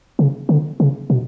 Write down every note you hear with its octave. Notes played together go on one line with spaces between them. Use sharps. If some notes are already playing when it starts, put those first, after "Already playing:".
C#3
D3
C#3
B2